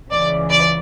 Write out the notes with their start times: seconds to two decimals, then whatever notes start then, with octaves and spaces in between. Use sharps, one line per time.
0.11 C#2 C#3 E3 D5
0.51 D5